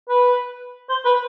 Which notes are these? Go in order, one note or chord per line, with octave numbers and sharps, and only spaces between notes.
B4
C5
B4